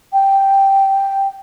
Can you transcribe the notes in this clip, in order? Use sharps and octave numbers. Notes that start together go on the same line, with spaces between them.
G5